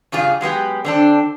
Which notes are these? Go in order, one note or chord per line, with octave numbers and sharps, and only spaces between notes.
G2 C#3 G3 B3 F4 G#4
F#3 G#3 B3 G4
D3 C4 D4